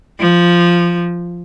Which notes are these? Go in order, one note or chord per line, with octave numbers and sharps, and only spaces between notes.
F3